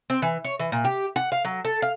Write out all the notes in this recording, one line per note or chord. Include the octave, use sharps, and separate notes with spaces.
C4
E3
C#5
E3
A#2
G4
F#5
F5
F#3
A4
F5